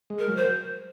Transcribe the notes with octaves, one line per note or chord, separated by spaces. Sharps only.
G#3
A#4
F#3
C5